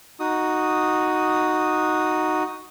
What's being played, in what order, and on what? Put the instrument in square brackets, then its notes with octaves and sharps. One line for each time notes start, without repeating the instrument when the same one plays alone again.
[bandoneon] D#4 F#4 D#6